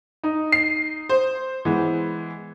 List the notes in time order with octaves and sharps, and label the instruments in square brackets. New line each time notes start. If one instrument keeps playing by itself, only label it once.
[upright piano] D#4
[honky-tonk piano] C7
C5
[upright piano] E3 G#3 B3